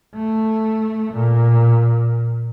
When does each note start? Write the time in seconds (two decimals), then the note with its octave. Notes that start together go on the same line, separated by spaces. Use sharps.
0.15 A3
1.13 A#2